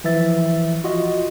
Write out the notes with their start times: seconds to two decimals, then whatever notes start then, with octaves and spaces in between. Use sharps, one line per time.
0.04 E3 F3 E5 A6
0.84 F4 F#4 D#5